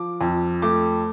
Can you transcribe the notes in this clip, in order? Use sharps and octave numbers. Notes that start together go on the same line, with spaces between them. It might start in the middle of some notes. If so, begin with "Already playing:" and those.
Already playing: F3 D6
F2
A3 D6